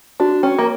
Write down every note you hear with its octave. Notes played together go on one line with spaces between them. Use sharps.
D4 F#4
C#4 G5
A#3